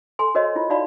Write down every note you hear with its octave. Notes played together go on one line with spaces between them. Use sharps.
A4 G#5 C6
F#4 A#4 C5 C#5 D#5
E4 F4
D#4 F#4 D5 F5 B5